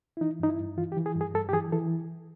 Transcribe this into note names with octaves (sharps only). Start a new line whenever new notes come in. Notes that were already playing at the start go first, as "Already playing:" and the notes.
E4
E3 D#4
G2 D#4
E4
G2
E3 F4
G4
E3
G#4
G2
G#4
G2 A4
G4
E3 G#4
E3 A4